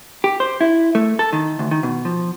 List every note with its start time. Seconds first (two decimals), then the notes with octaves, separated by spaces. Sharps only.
0.24 G4
0.40 C5
0.61 E4
0.95 A3
1.19 A4
1.33 D#3
1.59 D2
1.71 D#3
1.83 B2
2.05 F3